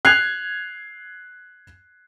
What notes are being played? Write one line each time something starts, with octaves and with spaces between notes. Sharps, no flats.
F#6 G#6 C7 F7